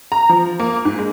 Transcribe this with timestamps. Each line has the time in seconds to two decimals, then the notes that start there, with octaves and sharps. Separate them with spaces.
0.12 A#5
0.29 F3
0.60 A#3
0.85 G#2
0.99 G#3